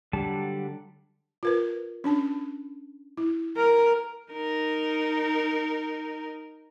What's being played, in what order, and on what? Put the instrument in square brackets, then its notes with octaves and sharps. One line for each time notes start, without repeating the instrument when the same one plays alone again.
[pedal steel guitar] D3 F#3 G3 A5
[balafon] F4 A#4 B4
C#4 D4 A5
E4
[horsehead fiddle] A#4
[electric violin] D#4 A#4